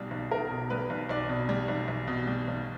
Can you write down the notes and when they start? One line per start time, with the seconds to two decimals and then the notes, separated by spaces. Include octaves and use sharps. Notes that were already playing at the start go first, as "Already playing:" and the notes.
Already playing: B1 B2 G3
0.11 B1
0.31 B1 A#4
0.51 B2
0.70 G3 B4
0.90 B1
1.09 B1 D5
1.29 B2
1.49 G3
1.68 B1
1.88 B1
2.08 B2
2.27 G3
2.48 B1